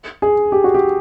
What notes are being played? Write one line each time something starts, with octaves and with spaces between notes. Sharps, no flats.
G#4
G4
F#4
G4